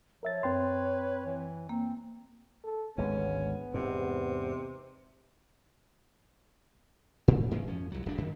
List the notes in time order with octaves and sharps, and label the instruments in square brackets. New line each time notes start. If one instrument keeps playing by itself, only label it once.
[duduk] F3 [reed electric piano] A#4 E5 A6 [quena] C#5
[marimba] F#2 [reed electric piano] C4 G5 C6 [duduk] B4
[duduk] E3
[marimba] A#3 [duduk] C4
[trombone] A4
[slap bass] G#1 D2 G#3 [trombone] B3 [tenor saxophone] C#4
[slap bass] E2 G#2 [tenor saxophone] C3
[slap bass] A2
G2 E3 G#3 A#3
F2 F3 C#4
C2 F#3
D#1 D4
F#2 D#3